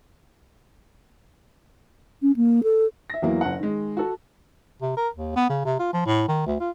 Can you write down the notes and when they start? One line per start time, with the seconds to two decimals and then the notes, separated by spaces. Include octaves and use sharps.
2.22 C#4
2.36 A#3
2.63 A4
3.10 E5 A#6
3.22 E2 F#3 A#3 E4
3.41 F#1 F#5
3.59 D#3 G#3
3.97 F#4 A4
4.82 C3
4.97 A#4
5.15 D#2
5.36 B3
5.49 C#3
5.65 C3
5.79 F4
5.93 F3
6.06 A2
6.28 D#3
6.46 D2
6.60 F4